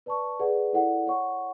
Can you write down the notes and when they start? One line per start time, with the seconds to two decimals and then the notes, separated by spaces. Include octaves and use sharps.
0.06 B4 D5 A5 C#6
0.40 G#4 B4 D5 F#5
0.73 E4 A4 D5 F#5
1.06 C#5 F#5 C#6